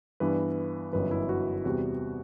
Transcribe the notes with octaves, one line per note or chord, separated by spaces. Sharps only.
G2 E3 B3 D4 B4
G1 F#2 E3 B4
E4
F#4
E2 C3 G3 B3 F#4